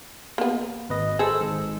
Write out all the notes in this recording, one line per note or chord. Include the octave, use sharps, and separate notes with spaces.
A#3 B3
G#1 B4 D#5
G#4 A4 C5 E6
G#1 G#2